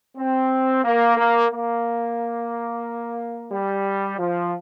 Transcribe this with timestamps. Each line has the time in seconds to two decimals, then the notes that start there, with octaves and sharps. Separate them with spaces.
0.17 C4
0.84 A#3
1.17 A#3
1.50 A#3
3.52 G3
4.19 F3